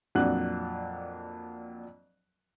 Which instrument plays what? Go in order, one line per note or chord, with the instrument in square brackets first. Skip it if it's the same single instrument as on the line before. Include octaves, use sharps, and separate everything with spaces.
[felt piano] F2 A#2 F#3 D4 F#6